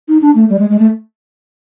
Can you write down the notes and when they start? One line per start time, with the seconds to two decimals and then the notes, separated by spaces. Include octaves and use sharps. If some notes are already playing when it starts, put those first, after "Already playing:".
0.08 D#4
0.22 D4
0.35 A3
0.50 G3
0.59 G#3
0.70 G#3
0.79 A3